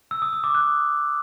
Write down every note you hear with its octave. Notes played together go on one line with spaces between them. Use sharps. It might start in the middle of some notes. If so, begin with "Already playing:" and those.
E6
D#6
D#6
D6
F#6